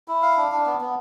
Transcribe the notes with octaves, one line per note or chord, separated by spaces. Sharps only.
E4
F5
D4
D4
B3
B3